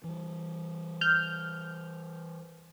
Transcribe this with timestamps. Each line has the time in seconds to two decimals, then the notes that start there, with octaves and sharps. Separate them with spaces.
0.04 E3 G3
1.01 F6 G6